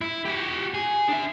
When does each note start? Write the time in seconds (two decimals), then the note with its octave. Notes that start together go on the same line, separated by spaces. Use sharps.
0.01 E4
0.25 F#4 G4
0.74 G#4
1.09 D4 E5